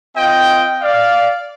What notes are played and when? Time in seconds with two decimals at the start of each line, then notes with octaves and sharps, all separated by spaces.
0.16 C4 F4 D#5 G5
0.81 D5 F5